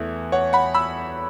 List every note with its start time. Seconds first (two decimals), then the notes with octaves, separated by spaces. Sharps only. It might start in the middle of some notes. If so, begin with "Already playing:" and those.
Already playing: E2 E3 A3 E5
0.32 C#5 F#5
0.53 F#5 B5
0.74 B5 E6